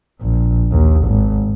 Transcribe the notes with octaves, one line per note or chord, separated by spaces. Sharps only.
A#1
D#2
G#1